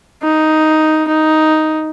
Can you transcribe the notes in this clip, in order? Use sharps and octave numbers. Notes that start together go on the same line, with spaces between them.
D#4
D#4